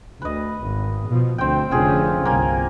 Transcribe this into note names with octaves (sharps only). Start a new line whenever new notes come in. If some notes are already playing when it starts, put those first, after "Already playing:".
D2 B4 D#5
G#1
B2 F3
D2 C4 G5
F1 D3 C#4 F4 G#4
G1 C2 A#3 G#5